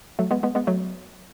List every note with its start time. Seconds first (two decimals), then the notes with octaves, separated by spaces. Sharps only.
0.19 F#3 A3
0.31 G#3 B3
0.43 G#3 B3
0.55 G#3 B3
0.67 F#3 A3